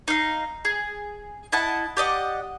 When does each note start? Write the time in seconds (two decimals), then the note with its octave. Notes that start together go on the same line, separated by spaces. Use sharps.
0.08 D#4 F5
0.65 G#4
1.52 E4 D#5 F#5 A5
1.97 G4 D5 D#5 F#5